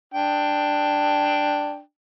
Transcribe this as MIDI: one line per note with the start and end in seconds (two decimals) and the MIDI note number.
0.14 1.80 62
0.14 1.80 79